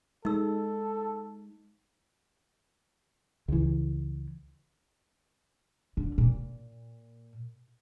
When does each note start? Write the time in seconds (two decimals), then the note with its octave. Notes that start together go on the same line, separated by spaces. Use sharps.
0.25 G#3 D#4 A4 E6
3.48 C#2 E3
5.97 D3
6.18 A#2